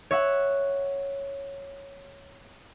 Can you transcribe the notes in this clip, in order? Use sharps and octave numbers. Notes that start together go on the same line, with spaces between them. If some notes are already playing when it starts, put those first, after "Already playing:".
C#5 E5 F#5